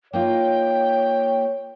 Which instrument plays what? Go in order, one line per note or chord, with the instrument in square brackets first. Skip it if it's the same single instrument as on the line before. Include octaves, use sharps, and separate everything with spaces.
[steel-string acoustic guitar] A#3 D#4 F4 [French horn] C#5 [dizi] G5